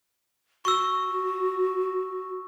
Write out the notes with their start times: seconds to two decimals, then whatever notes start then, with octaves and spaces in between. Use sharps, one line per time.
0.65 F#4 C#6 E6